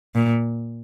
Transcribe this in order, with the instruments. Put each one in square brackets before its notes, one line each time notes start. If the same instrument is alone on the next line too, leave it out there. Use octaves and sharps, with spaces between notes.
[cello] A#2